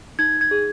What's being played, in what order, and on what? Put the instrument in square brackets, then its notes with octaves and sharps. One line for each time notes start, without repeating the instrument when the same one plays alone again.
[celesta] D#4 G#6
G#6
G#4